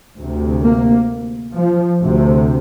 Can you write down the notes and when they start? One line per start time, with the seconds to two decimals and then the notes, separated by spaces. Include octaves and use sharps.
0.18 D2 C3
0.64 A#3
1.55 F3
2.01 D2 C3